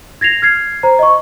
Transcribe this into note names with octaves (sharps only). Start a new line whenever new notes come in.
G#6 A#6 C7 F7
F6 G#6 C7
C5 A#5
D#5 C#6